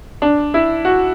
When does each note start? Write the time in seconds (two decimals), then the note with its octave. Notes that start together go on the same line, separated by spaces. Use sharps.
0.22 D4
0.54 E4
0.85 F#4